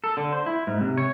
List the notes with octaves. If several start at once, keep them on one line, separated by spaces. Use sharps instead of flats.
A4
D3
C5
E4
G#2
C3
C#5